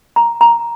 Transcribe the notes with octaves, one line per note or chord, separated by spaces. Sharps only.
A#5
A#5